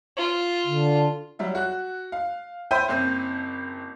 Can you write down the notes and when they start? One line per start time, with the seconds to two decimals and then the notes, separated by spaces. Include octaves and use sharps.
0.17 F4
0.64 D3
1.39 F#3 G3 E5
1.55 F#4 F#6
2.12 F5
2.71 C5 E5 G5 B5 G6 D#7
2.88 F#1 C4